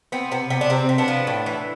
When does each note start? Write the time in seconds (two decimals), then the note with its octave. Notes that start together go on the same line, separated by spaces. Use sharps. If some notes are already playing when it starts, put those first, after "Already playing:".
0.12 B3 C4
0.31 C3 B3
0.50 C3 B3
0.61 D4
0.70 C3 C4
0.89 C3
0.98 B3 D4
1.08 F3
1.27 A2
1.46 E3